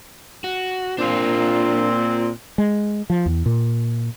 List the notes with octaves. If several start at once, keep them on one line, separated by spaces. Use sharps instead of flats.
F#4
A#2 C4 D4 F4
G#3
F3
E2
A#2